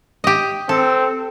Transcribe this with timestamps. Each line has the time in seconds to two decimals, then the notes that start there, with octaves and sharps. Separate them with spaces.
0.24 G4 D#5
0.69 C4 A4